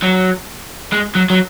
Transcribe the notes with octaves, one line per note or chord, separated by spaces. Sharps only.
F#3
G#3
F#3
F#3